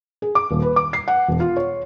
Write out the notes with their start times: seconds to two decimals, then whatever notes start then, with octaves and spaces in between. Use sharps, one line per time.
0.22 G#4
0.35 D6
0.50 D#1
0.62 B4
0.76 D6
0.93 C7
1.08 F#5
1.28 E1
1.40 F4
1.57 C#5